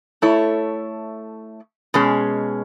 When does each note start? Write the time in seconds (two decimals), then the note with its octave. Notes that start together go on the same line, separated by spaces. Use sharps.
0.22 A3 E4 A4 C#5
1.94 B2 G#3 C#4 G#4